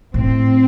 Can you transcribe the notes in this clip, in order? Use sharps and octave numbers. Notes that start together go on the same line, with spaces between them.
A2 C4